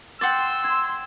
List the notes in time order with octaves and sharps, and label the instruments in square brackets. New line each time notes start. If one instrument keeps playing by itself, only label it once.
[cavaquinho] F#5 G5 D6 [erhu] C6 [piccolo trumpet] E6 [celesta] A6
[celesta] G#6